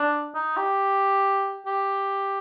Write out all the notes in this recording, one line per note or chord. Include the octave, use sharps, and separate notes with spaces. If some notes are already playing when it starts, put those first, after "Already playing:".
Already playing: D4
D#4
G4
G4